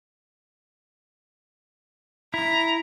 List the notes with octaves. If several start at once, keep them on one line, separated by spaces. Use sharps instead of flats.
E4 A#5